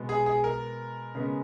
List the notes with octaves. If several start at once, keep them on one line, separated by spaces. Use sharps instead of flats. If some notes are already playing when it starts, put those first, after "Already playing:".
Already playing: B2 G#3 B3
G#4
G#4
A#4
C#3 G#3 B3